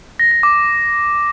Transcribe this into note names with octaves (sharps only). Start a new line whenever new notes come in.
A#6
A#6
D6